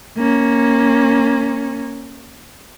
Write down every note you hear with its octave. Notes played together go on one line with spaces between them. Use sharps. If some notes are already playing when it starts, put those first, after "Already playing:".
A#3 C#4